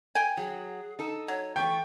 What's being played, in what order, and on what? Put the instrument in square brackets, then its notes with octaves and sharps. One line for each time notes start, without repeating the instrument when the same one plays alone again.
[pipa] G5 G#5
[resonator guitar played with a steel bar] F#3 [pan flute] G#4
[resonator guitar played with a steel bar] D#4 A4 [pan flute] A5
[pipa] F#3 [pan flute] C#5
[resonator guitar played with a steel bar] E3 A3 [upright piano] G5 [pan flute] C#6